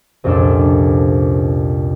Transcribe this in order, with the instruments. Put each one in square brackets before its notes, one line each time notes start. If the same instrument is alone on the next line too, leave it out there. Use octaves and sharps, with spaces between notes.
[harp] C2 F2 A#2 C#4 D4 A4